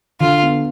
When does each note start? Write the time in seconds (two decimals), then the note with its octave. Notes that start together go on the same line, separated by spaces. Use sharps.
0.20 D3 F4
0.43 B3